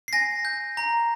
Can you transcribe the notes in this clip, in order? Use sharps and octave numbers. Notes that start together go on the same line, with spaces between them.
C7
G#5 A#6
G6
A#5